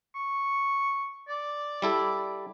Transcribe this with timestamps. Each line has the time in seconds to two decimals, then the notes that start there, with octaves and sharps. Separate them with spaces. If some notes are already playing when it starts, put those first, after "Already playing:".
0.15 C#6
1.29 D5
1.82 G3 E4 A4